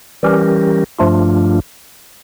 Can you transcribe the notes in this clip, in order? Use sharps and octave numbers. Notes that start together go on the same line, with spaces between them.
E3 G3 C#4 G4 A#4
G2 F3 A3 D4 F4